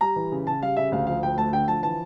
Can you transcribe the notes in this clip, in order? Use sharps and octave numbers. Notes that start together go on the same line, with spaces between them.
G3 A#5
E3
C#3
C#3 A5
G3 F5
C#3 E5
D2 F5
F3 F5
D2 G5
A3 A5
D3 G5
F3 A5
E3 A5